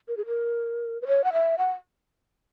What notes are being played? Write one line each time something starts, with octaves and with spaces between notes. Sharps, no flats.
A#4
G#4
A#4
B4
C#5
F#5
E5
F#5